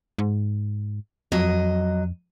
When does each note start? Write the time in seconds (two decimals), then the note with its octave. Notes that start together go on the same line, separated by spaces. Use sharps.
0.18 G#2
1.32 F2 F#3 D#5